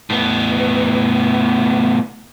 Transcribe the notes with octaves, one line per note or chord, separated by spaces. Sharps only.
A2 B3